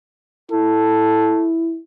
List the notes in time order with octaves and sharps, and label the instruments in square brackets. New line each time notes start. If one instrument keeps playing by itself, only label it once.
[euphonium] E4 [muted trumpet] A4